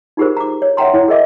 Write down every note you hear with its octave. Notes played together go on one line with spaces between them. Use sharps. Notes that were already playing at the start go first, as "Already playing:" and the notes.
D#4 F4 G4 G#4 A#4 C5
A#5 D6
C#5
C#5 E5 F#5 G5 A#5 C6
E4 C#5 G#5
G#4 A#4 D#5 E5 D6